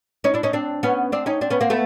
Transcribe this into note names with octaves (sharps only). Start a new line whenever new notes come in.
C#4 D#4
D4 E4
C#4 D#4
C4 D4
B3 C#4
C4 D4
C#4 D#4
C4 D4
B3 C#4
A#3 C4
A3 B3